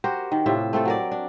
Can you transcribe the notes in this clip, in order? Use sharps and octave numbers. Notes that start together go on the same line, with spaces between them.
F#4 G4 A#4 C5
D#3
A2 C3 F4 E5
A3 C4 F4 A4
F#3 A#4 D5
D4